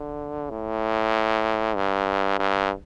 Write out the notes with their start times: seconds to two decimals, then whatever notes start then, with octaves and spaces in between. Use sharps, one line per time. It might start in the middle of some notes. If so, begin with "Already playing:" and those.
Already playing: D3
0.50 A2
1.76 G2
2.39 G2